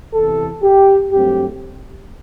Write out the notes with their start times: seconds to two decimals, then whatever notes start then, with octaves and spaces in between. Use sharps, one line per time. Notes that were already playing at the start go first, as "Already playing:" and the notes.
0.14 E2 C3 E3 A4
0.63 G4
1.12 G2 F#3 A3 C4 G4